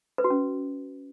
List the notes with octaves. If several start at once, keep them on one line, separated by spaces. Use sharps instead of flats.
B4
F#4
C#4